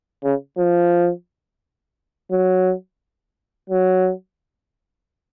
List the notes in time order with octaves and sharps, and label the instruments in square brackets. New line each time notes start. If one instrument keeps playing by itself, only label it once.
[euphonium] C#3
F3
F#3
F#3